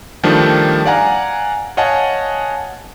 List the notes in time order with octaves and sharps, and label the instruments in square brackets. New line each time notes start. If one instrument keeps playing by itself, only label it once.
[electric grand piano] D#3 F3 G3 A3 D4
D5 F5 F#5 G#5 A#5
C#5 D#5 F5 F#5 G#5 A5